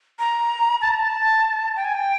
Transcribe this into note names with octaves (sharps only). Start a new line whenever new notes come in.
A#5
A5
A#5
A5
G5
G#5
G5